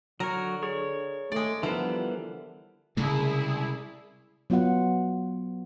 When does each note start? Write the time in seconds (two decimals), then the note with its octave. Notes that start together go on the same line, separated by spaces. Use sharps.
0.20 D3 F#3 A#4 C#5
0.63 G#4 C#5
1.32 G#3 A3 D5
1.63 D3 E3 F3 G3 B3 A#4 E5
2.97 C2 C#3 G#3 A3 E4 G#4
4.50 F#3 B3 F4 F#4 F#5